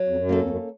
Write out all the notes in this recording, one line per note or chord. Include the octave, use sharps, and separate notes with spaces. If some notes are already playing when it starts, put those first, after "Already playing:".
Already playing: F#3
F2
F#2
A#3 C#4 A4
F2
F#2